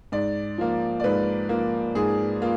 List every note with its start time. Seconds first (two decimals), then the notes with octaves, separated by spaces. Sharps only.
0.12 G#2 D5
0.58 F3 A#3
1.00 D5
1.04 G#2 B4
1.49 F3 A#3
1.95 G#2 G#4
2.42 A#3 F4